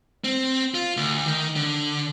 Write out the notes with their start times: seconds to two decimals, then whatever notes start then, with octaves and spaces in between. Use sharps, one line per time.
0.24 C4
0.74 F4
0.97 D2
1.26 D#3
1.56 D3